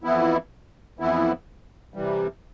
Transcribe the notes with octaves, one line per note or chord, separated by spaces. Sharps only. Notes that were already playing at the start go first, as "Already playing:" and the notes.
F2 E3 B3 E4
F2 E3 B3 E4
C3 E3 G3